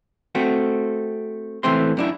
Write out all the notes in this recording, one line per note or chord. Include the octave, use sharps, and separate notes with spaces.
A3 C4 F#4
A2 E3 A3 C4 C6
F#2 D4 E4